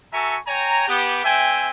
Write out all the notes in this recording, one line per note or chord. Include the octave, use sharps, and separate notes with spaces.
F#4 A4 E5 G#5 A#5 C#6
C#5 G5 G#5 A#5
B3 G4
A3 C4 E5 G5 G#5